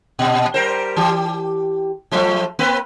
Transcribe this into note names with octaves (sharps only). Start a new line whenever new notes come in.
A#2
G3 A#4 C5
E3 G4
F3 F#3 A3
A#3 C4 B4